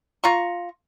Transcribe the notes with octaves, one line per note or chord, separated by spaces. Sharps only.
F4 A#5 C#6